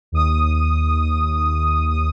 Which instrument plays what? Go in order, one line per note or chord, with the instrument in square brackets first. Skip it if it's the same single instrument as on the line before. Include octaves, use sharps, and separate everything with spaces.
[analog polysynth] D#2 D#6